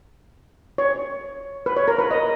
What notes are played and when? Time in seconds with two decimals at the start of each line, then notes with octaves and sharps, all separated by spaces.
0.78 C#5
1.66 B4
1.77 C#5
1.88 A#4
1.99 B4
2.11 D#5